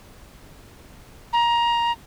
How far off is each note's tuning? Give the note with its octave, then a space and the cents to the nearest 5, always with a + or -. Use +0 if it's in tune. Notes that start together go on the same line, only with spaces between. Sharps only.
A#5 +15